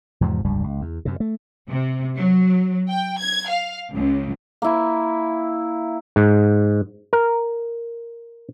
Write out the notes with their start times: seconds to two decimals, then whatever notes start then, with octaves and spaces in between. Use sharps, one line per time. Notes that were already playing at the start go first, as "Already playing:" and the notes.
0.21 E2 G#2 C3 F3
0.44 F1 C#2 G2 G3
0.64 C#2
0.81 E2
1.05 F#2 C3
1.20 A3
1.69 C3
2.17 F#3
2.90 G5
3.19 G#6
3.49 F5
3.93 C#2
4.62 A#3 E4
6.16 G#2
7.13 A#4